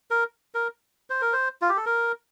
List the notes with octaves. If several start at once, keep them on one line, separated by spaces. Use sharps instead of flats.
A#4
A#4
C5
A#4
C5
F4
G4
A4
A#4